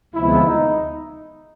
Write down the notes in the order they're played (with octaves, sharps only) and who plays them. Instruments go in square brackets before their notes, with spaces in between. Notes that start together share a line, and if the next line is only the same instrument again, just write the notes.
[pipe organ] D2 C3 F3 G#3 B3 [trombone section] E4
[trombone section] D#4